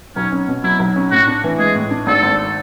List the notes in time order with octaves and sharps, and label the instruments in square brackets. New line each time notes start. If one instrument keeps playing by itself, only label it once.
[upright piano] B1 [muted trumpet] C#4
[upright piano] C#4
B2
[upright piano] F#3 [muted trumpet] E4
[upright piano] B1
C#4
[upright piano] A2 [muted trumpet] F#4
[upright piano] D4
E3
[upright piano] G#3 [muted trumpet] G#4
[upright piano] A2
D4
[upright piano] G#1 [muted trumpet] A4
[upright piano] G#1